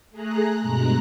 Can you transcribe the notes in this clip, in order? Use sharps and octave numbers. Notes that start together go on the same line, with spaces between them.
A3 G#4 A#5 F#6
G2 B2 G#3 A#5 F#6